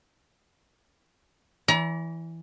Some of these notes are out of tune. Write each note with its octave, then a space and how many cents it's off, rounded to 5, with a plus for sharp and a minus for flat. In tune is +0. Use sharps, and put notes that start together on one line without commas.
E3 +0 D5 -35 A#5 +35